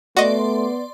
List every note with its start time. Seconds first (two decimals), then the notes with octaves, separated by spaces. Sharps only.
0.17 A3 B3 F#4 D5 D#5 C6